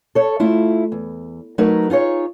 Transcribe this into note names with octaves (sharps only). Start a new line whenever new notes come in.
A4 C#5
A3 E4 F4
E2
F#3 A3 D#4 A#4 B4
D#4 F4 G#4 C#5